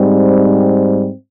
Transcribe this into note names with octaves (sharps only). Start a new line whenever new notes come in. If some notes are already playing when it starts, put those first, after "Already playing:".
Already playing: G#2 G3 C4